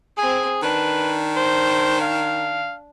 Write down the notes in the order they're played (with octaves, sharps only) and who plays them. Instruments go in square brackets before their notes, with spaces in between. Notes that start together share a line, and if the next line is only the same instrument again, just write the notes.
[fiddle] C4 G#5 [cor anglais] G#4
[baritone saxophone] D#3 [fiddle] D4 [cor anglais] B4
[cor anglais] C5
F5